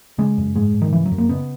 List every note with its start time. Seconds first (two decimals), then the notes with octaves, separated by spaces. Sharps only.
0.18 C#3 G#3
0.38 F#2
0.56 G#2 G#3
0.74 G#2
0.82 D#3
0.93 C#3 E3
1.06 F#3
1.12 F#2
1.18 A#3
1.29 C#3 B3